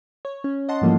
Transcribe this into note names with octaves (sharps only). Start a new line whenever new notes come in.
C#5
C#4
D#5 F#5 A5 C6
G#2 E3 F3 G3 A3 A#3